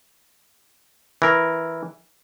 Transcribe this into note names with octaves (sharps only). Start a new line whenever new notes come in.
E3 A#4